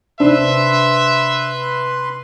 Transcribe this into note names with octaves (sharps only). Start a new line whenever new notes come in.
C3 D4 B4 C5 E5 C6